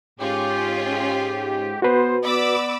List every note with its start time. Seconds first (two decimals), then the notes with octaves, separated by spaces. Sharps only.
0.20 G#2 C#4 F4 G4 G#4
1.82 B3 F#4 B4 C5
2.23 B3 D5 B5 D6 E6